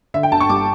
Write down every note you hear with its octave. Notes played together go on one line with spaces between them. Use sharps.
D3 E5
G5
G1 A5
C#6
G3 D6